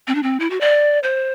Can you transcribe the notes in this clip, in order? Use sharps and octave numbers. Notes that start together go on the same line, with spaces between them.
C4
D4
C4
E4
F#4
D5
C5